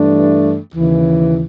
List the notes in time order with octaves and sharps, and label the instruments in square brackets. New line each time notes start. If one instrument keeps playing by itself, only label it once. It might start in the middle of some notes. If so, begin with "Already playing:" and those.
Already playing: [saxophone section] G2 E3 A3 D4
D#2 C#3 E3